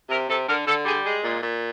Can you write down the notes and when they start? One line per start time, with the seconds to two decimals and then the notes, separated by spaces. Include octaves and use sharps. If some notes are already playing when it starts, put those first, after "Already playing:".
0.10 C3 A#4
0.29 C3 A4
0.48 D3 A#4
0.67 D3 A4
0.86 G3 G#4
1.05 G#3 G#4
1.24 A#2
1.43 A#2